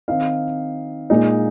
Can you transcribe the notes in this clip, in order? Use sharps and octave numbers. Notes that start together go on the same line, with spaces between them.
D#3 C4 D#4 F5
A#2 G#3 D#4